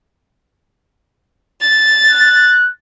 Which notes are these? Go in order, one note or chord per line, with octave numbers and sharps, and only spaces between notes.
A6
F#6